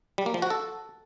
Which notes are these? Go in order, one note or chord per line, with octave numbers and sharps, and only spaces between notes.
G3
A#3
F3
F#4
A4